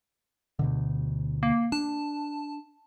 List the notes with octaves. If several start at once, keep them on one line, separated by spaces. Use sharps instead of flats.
D2 B2 D3
A#3
D4 A5